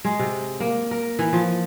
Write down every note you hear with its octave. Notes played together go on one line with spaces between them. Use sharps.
G#3
C3
A#3
A#4
E3
F3